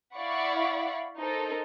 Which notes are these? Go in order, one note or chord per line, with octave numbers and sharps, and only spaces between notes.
E4 D5 F5 F#5 B5 C#6
D#4 A4 A#4 C5